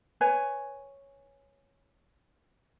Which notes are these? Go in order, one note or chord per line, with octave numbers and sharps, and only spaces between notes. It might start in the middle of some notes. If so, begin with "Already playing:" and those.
B4 C#5 G#5